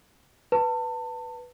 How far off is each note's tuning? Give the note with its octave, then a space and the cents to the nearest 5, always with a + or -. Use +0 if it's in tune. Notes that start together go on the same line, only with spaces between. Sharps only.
B4 +0 A5 +30